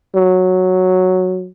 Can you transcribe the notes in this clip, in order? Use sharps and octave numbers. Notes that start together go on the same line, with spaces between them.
F#3